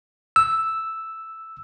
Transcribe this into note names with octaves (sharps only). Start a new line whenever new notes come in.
E6